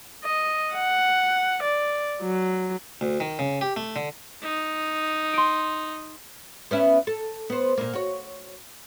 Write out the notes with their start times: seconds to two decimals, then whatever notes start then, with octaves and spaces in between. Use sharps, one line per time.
0.24 D#5
0.74 F#5
1.63 D5
2.22 F#3
3.01 D2
3.20 D#3
3.39 C#3
3.61 G4
3.76 A3
3.96 D3
4.42 D#4
5.33 C6 D7
6.71 B3 C#4 E4
7.07 A4
7.50 B3 C5
7.78 A#2 A#3
7.93 F#4 C#5